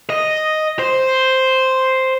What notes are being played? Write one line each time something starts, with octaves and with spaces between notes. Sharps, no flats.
D#5
C5